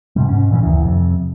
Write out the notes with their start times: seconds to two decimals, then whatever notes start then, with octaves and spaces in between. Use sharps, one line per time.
0.16 G#2 C3 G3
0.29 G#2 C#4
0.51 A#2 E3 A#3 C#4
0.63 F#1 D2 D#3 E3
0.82 F2 C3